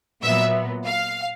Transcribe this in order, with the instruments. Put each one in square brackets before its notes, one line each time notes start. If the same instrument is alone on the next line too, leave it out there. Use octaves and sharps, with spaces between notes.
[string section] A#2 F#3 B3 E5
F5